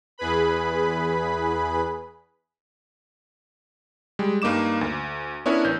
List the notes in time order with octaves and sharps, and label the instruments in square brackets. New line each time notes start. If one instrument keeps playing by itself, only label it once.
[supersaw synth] E2 G#4 B4 B5
[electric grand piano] G3 G#3
G2 A#3 D#4 D6 E7
D2
B3 C#4 D4 E4 A#4 C#5
A1 G6